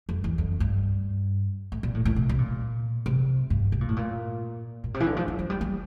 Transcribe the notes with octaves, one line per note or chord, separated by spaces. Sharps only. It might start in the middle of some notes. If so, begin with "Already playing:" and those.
F2
E2
F2
G2
A2
A#2
A2
A2
C3
C3
A#2
C3
G2
C3
A#2
A2
A#2
A#2
C3
E3
D3
F3
F3
F3
G3
A#3